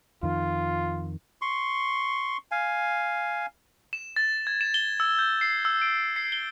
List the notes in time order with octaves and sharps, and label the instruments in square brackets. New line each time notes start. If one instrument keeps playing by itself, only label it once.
[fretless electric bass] F2 D#3 [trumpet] F4
[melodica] C6 C#6
F5 G#5
[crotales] E7
A6
G#6
E7
G7
E6
G6
C7
E6
D7
C7
G7